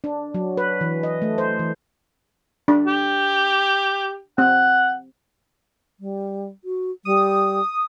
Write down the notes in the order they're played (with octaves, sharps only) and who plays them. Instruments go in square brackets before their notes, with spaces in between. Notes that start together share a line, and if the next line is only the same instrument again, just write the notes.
[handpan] D4
F#3
B4
E3
D#5
A3
C5
E3
[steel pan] D4
[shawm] G4
[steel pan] C4 [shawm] F#5
[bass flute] G3
F#4
[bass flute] G3 [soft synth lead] D#6